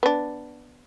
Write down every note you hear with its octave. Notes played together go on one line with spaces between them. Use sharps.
B3 D4